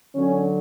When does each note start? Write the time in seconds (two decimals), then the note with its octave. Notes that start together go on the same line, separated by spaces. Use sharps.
0.15 D3 F#3 C#4